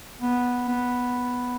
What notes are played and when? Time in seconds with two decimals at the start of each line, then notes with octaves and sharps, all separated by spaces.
0.22 B3
0.68 B3